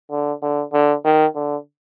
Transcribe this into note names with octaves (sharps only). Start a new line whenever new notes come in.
D3
D3
D3
D#3
D3